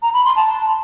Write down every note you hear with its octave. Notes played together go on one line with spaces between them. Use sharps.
A#5
B5
C6
A5